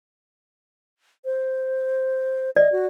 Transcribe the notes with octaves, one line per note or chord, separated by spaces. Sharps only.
C5
D5 D#5
F#4